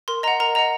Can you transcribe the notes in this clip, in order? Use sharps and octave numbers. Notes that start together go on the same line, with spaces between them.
A#4 C6
D#5 F#5 A#5
A#4 A#5
D#5 F#5 A#5